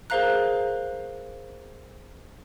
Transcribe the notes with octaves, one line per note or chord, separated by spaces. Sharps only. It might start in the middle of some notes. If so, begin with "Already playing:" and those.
G#4 A#4 C5 F5 A#5 F#6